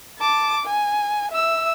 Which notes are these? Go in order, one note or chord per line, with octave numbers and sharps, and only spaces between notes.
A5 D6
G#5
E5 E6